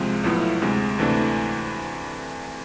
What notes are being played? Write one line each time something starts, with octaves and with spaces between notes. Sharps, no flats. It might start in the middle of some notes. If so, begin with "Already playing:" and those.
Already playing: C2 C3 F3 G#3
B1 A2 F3 B3 E4
D2 C3 G#3
D2 C3 E3 A3 D4